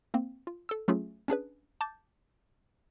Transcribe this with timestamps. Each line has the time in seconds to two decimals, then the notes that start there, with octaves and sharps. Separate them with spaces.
0.14 A#3 C4
0.47 F4
0.69 A4 E6
0.88 F#3 A3 C#4 F4 G#4
1.28 C#4 D4 G#4 B4
1.81 A5 D6 G6 A6